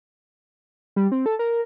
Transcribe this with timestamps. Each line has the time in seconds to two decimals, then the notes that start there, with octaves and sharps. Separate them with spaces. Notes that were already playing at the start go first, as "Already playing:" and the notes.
0.96 G3
1.12 C4
1.26 A4
1.39 A#4